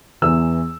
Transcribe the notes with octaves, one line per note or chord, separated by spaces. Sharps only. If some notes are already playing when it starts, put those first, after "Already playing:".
E2 E3 E6